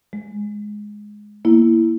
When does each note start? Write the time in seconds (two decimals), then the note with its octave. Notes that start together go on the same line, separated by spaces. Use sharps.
0.13 G#3
1.45 A#3 B3 E4